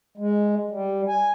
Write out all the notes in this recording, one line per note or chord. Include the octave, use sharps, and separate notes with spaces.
G#3
G3
G#5